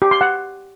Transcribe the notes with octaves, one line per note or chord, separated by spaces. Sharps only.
G4
C6
F#5